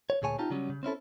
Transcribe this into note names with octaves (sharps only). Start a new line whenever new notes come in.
C#5
D2 A#2 G#4 C#5 G#5 A5
C4 D#4 F4 G4 A5 A#5
C#3 F#3 G3 C#4
C#3
C4 C#4 E4 A4